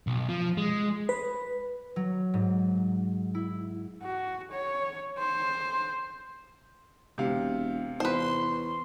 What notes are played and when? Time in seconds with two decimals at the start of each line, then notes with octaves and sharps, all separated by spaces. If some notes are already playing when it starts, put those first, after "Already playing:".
0.07 B1
0.29 F3
0.57 G#3
1.09 B4
1.96 F#3
2.34 G#2
3.35 E4
4.02 F#4
4.52 C#5
5.19 C5
7.18 E1 C3 F5
8.00 E2 B4 C5 C6